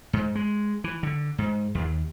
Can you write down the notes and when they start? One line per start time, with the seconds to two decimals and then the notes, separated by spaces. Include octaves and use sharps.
0.13 G#2
0.35 G#3
0.84 E3
1.03 D3
1.38 G#2
1.75 D#2